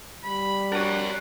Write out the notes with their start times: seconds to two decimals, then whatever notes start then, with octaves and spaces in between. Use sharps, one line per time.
0.24 G3 B5
0.72 D4 F#4 A#4 C#5 F#5